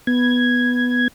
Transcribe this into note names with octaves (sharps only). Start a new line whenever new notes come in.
B3 G#6